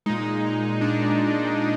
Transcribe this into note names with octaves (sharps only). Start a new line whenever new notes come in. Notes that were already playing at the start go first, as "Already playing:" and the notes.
A#2 G#3 D#4
D4